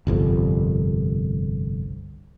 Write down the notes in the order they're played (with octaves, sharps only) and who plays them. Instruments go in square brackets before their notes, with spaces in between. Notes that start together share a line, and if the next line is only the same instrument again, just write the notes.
[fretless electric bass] G1 C2 F2